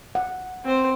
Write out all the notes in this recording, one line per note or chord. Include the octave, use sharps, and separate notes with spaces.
F#5
C4 C5